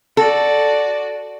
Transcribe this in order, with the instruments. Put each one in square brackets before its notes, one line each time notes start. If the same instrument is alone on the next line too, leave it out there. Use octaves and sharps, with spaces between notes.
[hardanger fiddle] F#4 D5 [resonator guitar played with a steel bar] A4